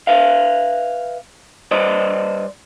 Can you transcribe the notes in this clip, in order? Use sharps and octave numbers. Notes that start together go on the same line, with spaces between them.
B4 E5 F5
G3 B4 C5 D5 D#5